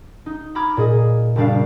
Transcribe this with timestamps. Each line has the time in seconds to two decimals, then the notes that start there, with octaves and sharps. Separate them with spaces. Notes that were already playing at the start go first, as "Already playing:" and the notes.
0.26 D#4
0.55 A#5 B5 D6 F6 G#6
0.77 A#2 G#4 D#5
1.36 F#1 G3 D4 F5